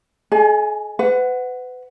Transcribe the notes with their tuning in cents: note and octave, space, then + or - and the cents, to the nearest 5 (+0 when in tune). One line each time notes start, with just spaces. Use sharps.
G#4 +45 D#5 +0 G#5 +0
B4 +35 F#5 +0